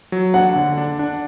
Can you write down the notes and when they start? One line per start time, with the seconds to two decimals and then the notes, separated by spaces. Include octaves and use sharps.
0.12 F#3
0.34 D4 F#5
0.56 D3
0.78 D4
0.99 D4